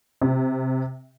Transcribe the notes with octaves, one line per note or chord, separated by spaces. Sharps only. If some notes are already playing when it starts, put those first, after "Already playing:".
C3